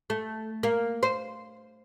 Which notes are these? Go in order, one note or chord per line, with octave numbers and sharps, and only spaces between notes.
A3
A#3
C5